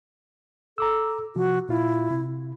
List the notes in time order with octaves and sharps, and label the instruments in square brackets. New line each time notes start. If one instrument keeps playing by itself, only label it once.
[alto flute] A4 [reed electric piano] A#5 D6 E6
[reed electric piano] C3 F3 [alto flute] F#4
[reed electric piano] A#2 F4 [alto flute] E4
[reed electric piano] C3